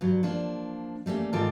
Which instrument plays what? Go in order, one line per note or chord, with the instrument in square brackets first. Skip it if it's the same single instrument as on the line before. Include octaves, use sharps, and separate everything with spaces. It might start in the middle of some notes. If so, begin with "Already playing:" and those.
[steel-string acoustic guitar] G2 F#3
F3 A#3 D4
G3 A3 A#3 C#4
G#2 D#3 F4 A4 A#4 D5